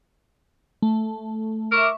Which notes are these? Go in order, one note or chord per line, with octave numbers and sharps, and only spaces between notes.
A3
A#4 E5 C#6 D6